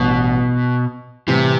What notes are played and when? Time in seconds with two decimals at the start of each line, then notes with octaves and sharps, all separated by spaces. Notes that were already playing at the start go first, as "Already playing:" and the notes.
Already playing: A1 G2 B2 E3 B3
1.27 A2 C3 E3 G3 C4